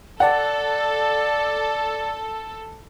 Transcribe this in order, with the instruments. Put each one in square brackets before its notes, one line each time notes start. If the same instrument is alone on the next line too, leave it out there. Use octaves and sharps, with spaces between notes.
[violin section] A4 [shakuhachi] D5 [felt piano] F#5 A5